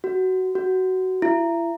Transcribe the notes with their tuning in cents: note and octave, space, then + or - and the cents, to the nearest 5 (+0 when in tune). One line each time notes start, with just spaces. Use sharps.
F#4 +15
F#4 +15
E4 +35